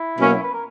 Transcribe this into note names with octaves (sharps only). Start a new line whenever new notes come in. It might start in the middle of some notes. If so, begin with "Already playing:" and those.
Already playing: E4
B2 F#3 A#3 C#4
B4
A#4